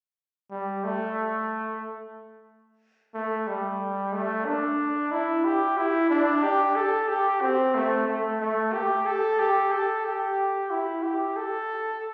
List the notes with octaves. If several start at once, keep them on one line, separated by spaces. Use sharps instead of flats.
G3
A3
A3
G3
A3
D4
E4
G4
E4
D4
G4
A4
G4
C4
A3
A3
A3
G4
A4
G4
A4
G4
E4
G4
A4